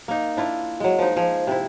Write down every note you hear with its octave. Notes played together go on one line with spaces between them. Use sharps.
A#3 D#4
D4 E4 F4
F#3 G#3
F3 D#4
F3 G#4
C3 E4